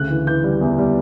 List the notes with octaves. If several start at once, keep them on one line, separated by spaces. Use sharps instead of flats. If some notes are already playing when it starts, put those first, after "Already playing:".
Already playing: D2 C#3 F#6
E3
E3 G6
G3
E2
G3